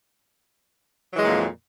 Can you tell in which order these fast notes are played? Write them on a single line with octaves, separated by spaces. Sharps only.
F#3 E3 G#3 A#2 F2